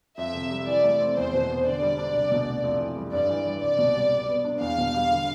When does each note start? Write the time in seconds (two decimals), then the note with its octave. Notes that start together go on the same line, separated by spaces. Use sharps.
0.18 F2 E5
0.35 C3
0.51 G3
0.67 E3 D5
0.84 A3
1.00 C4
1.16 E2 C5
1.33 B2
1.50 B3
1.65 D3 D5
1.82 G3
1.98 D4
2.15 C2
2.32 B2
2.47 A3
2.64 F2
2.80 E3
2.96 G3
3.13 G2 D5
3.30 E3
3.47 G3
3.62 C2 D5
3.78 B2
3.95 G3
4.12 G3
4.29 B3
4.44 D4
4.61 E2 F5
4.78 B2
4.94 G3
5.11 D3